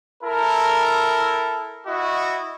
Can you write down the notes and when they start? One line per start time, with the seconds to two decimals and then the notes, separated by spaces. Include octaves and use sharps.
0.24 E4 A4 A#4
1.87 E4 F#4 D#5